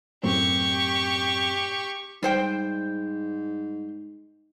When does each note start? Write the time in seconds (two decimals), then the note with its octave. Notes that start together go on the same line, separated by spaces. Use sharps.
0.23 F#2 A2 C4 G4 C#6
2.23 G#2 G3 C5 G5